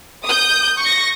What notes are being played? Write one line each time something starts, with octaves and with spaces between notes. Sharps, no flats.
D#6 G6
C#6 A#6